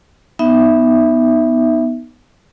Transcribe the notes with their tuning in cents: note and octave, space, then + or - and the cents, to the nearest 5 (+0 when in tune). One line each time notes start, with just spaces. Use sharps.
B3 +0 D#4 +0 E5 +0